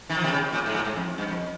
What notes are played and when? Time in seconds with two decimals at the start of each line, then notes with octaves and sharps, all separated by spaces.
0.10 D#3
0.17 F3
0.24 C3 D#3
0.31 C#3
0.52 A#2
0.66 G#2
0.74 A#2
0.85 G#2
0.96 F2
1.18 G2
1.28 F2